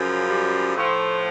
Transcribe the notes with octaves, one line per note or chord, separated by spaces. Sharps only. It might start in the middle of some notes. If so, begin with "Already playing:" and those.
Already playing: F#2 C#3 F3
G3
A2 F3 A3